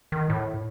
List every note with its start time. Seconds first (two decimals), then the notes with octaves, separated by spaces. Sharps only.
0.12 D#3
0.30 A2